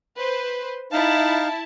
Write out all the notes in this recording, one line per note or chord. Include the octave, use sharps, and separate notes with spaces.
B4 C5
D#4 E4 F5 A5